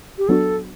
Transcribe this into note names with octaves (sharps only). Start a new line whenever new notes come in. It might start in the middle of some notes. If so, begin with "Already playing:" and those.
G4
F#3 B3 D4 F#4 A4